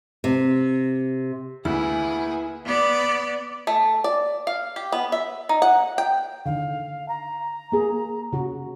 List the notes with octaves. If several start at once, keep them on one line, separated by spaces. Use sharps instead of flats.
C3
D2 A#3 B3 E4 G#4
B3 D5
A3
D5
F5
G4
B3
E5
D#4
F#5
G5
D3 D#3 F5
A#5
A#3 G#4
C#3 F#4